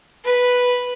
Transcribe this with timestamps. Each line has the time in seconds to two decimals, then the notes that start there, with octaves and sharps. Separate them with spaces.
0.24 B4